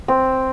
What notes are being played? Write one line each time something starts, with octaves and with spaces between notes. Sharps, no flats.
C4